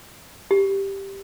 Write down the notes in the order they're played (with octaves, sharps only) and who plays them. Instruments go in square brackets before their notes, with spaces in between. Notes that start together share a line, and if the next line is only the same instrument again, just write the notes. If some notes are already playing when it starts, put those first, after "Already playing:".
[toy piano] G4